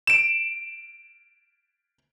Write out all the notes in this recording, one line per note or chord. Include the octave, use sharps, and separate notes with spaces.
D7 E7